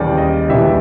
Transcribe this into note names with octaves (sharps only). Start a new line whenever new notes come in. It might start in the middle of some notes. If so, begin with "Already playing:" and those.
Already playing: D#2 C#3 E3 G3 D5
D#5
D#2 C#3 E3 G3 E5